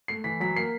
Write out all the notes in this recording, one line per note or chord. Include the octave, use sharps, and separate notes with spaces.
A3 C7
E3 B6
F#3 B6
A#3 C7